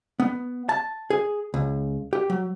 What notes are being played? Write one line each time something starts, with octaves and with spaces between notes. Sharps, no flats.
B3
A5
G#4
C#2
G4
F#3